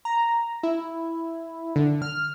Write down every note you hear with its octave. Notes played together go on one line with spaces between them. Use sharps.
A#5
E4
D3
F6